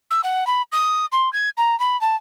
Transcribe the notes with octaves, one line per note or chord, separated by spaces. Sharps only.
E6
F#5
B5
D#6
C6
G#6
A#5
B5
A5